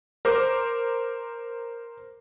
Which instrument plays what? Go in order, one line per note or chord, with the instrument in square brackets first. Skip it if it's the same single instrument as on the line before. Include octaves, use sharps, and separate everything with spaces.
[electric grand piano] A#4 C5 D6